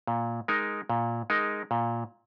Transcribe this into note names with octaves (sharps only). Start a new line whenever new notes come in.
A#2
G#3 D#4 A#4
A#2
G#3 D#4 A#4
A#2